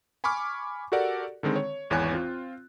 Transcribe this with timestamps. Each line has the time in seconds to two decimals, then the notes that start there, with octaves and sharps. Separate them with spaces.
0.24 G#5 B5 C#6 D6 F6
0.92 F#4 G4 A4 A#4 D5 F#5
1.43 D3 D#3 G#3 C4
1.56 C#5
1.90 G#1 E2 E3 C#5 G#5 F#6
2.12 C4 F4